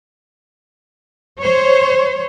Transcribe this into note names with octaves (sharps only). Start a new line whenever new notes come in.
C5 C#5